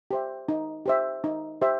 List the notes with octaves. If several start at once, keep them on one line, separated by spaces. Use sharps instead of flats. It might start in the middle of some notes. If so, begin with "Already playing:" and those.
G4 C5 E5
D#4
G4 C5 E5
D#4
G4 C5 E5